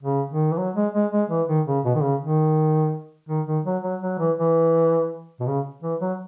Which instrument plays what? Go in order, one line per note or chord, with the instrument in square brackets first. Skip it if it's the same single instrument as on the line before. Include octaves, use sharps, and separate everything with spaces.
[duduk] C#3
D#3
E3
F#3
G#3
G#3
G#3
E3
D#3
C#3
B2
D#3
C#3
D#3
D#3
D#3
F#3
F#3
F#3
E3
E3
B2
C#3
E3
F#3